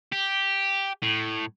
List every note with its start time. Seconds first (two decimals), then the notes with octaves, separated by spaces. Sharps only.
0.12 G4
1.03 A2